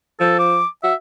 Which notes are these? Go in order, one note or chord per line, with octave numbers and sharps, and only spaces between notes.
F3 A4
D6
F#4 E5